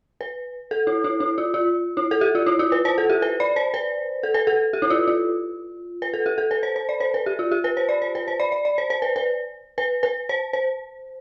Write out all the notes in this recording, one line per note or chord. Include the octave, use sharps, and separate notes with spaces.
B4
A4
E4
E4
E4
F4
F4
E4
A4
G4
F4
E4
F4
B4
C5
A4
G4
B4
D5
C5
B4
A4
B4
A4
G4
E4
F4
F4
B4
A4
G4
A4
B4
C5
C5
D5
C5
B4
G4
F4
G4
B4
C5
D5
C5
B4
C5
D5
D5
D5
C5
C5
B4
B4
B4
B4
C5
C5